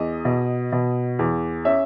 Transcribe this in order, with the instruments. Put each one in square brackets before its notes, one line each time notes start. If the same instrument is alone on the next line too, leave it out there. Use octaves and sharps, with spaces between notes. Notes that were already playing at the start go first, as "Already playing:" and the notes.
Already playing: [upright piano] E2 D#5
B2
B2
E2
C#4 E5